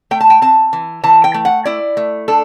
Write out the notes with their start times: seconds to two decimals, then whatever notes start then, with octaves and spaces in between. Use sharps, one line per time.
0.11 A3 G5
0.21 A5
0.30 G5
0.42 C4 A5
0.73 E3
1.04 E3 A5
1.24 G5
1.34 A3
1.45 F#5
1.65 E4 D5
1.97 A3
2.28 D4 A4